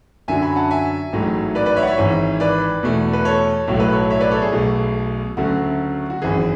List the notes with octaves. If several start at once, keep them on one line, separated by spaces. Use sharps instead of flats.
F#2 D3 F#3 E5 G#5
G#5 B5
F#5 A5
E5 G#5
A1 G#2 F#3 A3
B4 D5
B4 D5
C#5 E5
F#5
C#5 E5
G#1 G#2 E3
B4 D5
E2 B2 A3
B4
A4 C#5
B1 A2 F#3 A3 C#5
B4
A4 C#5
C#5 E5
B4 D5
A4 C#5
G#4
B1 B2 A3
D2 C#3 F#3 A3 F#4
F#4
G#1 F#2 E3 G#4